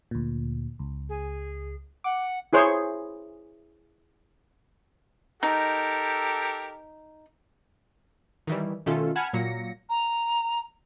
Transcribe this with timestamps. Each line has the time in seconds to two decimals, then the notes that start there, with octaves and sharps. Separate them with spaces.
0.11 D2 A#2
0.79 C#2
1.09 G#4
2.04 F#5 D6
2.53 E4 G#4 C5 C#5
5.43 D#4 G4 A4 A#4
8.47 D#3 E3 G3
8.86 B2 D#3 A3 C#4 F4 A4
9.16 F#5 G#5 A5 B5 F6 G#6
9.33 A#2 F#3 A#3 A#6 C#7
9.89 A#5